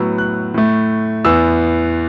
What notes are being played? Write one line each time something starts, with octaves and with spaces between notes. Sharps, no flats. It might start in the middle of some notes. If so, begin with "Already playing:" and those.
Already playing: A2 F#3 B3 E6
F#6
A2 A3
E2 E3 B3 E6